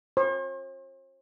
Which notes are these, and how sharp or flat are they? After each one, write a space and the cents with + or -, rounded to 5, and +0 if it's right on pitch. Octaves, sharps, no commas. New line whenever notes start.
C5 +45